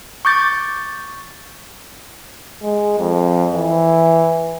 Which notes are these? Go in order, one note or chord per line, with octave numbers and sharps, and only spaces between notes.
C#6 D6 G6 A6
G#3
F2
E3